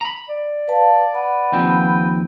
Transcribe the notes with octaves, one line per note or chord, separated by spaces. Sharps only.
A#5 B5
D5
B4 F5 A5
B4 F#5
D#2 F3 C4 G5